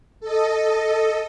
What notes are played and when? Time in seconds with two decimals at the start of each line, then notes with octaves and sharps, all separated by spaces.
0.20 A4 D#5